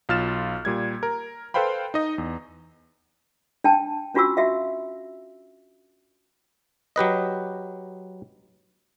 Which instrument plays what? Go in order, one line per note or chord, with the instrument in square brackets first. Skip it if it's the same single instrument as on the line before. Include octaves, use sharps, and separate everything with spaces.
[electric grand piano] B1 F4 F6 A6 E7
A#2 G3 G#6
A#4
A4 B4 C5 F5 G5 B5
D#4 D#5
E2
[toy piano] D4 G5 A5
C#4 D4 F4 F#4 C#6 E6
F#4 E5 F5
[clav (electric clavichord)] F#3 G4 B4 D#5